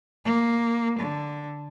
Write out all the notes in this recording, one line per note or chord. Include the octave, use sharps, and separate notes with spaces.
A#3
D3